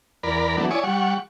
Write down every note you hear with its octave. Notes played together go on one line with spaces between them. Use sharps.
E2 A#4 D5 B5
E3 F#3 A3 B3 D4
E4 C#5 D5 G#5 C#6 D#6
G3 F#5 C#6